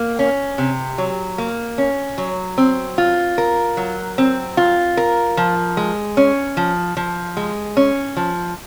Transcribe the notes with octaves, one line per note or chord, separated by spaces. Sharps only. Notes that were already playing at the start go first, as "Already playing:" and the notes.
Already playing: A#3
C#4
C3
F#3
A#3
C#4
F#3
C4
F4
A#4
F#3
C4
F4
A#4
F3
G#3
C#4
F3
F3
G#3
C#4
F3